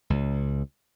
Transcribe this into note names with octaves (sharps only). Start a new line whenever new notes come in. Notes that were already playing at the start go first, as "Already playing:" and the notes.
C#2